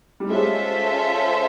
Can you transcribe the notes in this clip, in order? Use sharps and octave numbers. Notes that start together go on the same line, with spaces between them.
G3
G#3 C#4 F4 A4 C5 E5